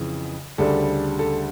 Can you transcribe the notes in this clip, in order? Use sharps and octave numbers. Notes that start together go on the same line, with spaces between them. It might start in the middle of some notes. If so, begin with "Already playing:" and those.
Already playing: F2 C#3 E3
D2 C#3 G3 D4 A4
A4